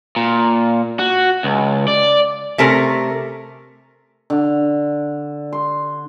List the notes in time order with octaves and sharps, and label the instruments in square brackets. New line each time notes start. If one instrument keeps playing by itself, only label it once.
[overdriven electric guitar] A#2
F#4
C#2
D5
[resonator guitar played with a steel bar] C3 A3 C#4 A#4
[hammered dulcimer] D3
C6